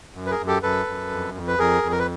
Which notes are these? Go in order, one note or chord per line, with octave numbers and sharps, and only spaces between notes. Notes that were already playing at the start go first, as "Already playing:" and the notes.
F#2
B4
G#4 A#4
F#2
G4 A4
F#2 A4 B4
F#2
F2
F2
B4
F2 G#4 A#4
F2
A#4
B4